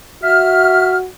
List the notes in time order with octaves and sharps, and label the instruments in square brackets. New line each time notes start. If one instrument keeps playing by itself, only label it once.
[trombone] F#4 [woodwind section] E5 F6